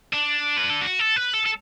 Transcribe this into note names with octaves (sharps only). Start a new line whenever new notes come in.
D4
B4
A4
F#4
A4
B4
A4
A4